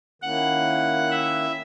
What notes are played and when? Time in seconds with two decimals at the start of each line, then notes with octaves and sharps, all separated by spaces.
0.22 D#3 A#3 C#4 E4 F#5
1.11 E5